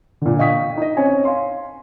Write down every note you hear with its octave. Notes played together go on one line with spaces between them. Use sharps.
A#2 D3
D#5 F5 G5 C#6 D#6 B6
D#4 D#5
C4 C#4 C#5 G#5
F5 C6